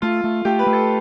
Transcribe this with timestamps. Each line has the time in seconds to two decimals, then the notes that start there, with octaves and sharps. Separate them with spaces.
0.02 A3 F4
0.24 A3
0.45 A3 G4
0.59 B4
0.67 A3
0.73 A4